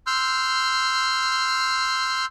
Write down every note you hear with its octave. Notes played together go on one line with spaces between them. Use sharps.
C6 E6 F6 G6